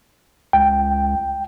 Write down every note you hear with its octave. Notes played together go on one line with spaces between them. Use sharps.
C#2 G5